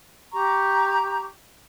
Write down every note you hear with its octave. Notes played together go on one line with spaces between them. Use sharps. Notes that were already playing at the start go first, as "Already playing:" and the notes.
G4 A#5 C#6